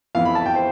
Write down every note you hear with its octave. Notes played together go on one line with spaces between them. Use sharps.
F2 E3 B3 F5
B5
A5
G5
C5